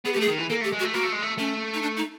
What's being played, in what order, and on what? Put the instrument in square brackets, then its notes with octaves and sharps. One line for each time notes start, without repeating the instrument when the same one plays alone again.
[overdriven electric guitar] B3 [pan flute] G#4
[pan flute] G4
[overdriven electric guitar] A3
[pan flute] G#4
[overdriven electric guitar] D#3
E3
[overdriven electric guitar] A#3 [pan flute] A4
[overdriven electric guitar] A3
[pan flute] G4
[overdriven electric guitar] G#3
[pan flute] F#4
[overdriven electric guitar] A3
[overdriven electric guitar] A#3 [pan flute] F#4
[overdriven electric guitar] A3
G#3
A3
[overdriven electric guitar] A3 [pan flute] C#4
[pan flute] D#4
D4
D#4